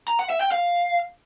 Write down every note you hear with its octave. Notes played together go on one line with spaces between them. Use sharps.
A#5
F#5
E5
G5
F5